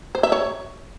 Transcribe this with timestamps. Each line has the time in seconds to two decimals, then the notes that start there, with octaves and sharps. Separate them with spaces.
0.15 C5
0.23 E5
0.32 C#5